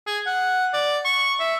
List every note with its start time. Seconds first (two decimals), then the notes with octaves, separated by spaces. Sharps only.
0.07 G#4
0.27 F#5
0.73 D5
1.05 C#6
1.40 E5